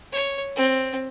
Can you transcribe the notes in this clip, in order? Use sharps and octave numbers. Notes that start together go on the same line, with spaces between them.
C#5
C4